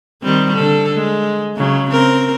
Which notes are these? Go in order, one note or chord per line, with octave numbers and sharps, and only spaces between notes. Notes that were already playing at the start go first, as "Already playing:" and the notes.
D#3 G3 C4
D3 A4
G#3
C#3 F#3
C4 A#4